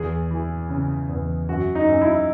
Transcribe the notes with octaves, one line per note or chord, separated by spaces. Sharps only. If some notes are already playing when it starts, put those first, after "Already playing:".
Already playing: E2 G#4
E3
C#3
E2
F#2 F#4
D#4
F#2
E4